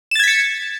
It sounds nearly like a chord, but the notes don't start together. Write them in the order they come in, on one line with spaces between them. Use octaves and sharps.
E7 A6 G#6 B6 C#7